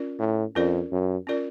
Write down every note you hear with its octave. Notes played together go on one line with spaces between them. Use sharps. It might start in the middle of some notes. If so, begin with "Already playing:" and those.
Already playing: C#4 F4 A#4 D5
A2
F2 C#4 F4 A#4 D5
F#2
C#4 F4 A#4 D5